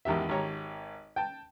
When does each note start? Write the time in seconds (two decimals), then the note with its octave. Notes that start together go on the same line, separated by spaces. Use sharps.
0.05 G#1 E2 D#3 G4 E5
0.29 G#1 G4 C#5 A#5
1.16 G5 A5